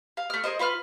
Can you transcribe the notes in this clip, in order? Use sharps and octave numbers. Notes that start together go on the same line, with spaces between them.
F5
A3 F6
G#4 A#4 C5 D#5
F4 B4 C#6 F6